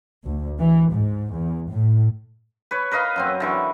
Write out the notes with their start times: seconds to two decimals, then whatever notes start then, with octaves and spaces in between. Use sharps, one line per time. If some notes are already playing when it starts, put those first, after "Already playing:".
0.24 D2
0.58 E3
0.91 G#2
1.31 E2
1.69 A2
2.71 B4 C#5
2.91 A#4 B4 D#5 F5
3.16 F#2 F#3 C4
3.40 D3 E3 C#6